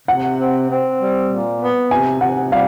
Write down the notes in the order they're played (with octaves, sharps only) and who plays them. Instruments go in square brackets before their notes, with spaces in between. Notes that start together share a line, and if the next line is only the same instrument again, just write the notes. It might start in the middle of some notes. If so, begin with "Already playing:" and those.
[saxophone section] C3 [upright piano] F#5
[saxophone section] C4
C4
G3
A#2
B3
[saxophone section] C3 [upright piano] G#5
[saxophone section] C3 [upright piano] F#5
[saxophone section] G3 [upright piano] F5